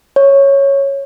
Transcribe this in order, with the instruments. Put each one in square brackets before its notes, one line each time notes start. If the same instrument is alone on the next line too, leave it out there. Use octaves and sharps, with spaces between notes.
[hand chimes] C#5